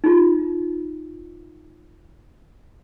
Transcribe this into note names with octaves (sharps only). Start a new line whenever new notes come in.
D#4 F4